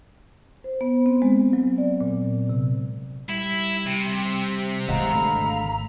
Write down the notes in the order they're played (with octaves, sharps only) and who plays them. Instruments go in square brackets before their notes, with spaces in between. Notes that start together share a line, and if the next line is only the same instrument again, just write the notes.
[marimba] C5
B3
C4
G#3
F#3
D5
A#2
C3
[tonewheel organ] G3 [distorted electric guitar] E4
[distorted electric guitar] C3
[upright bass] G#1 G#2 [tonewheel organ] D#5 F#5 [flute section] F5 A#5 E6
[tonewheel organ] D3 A3 B5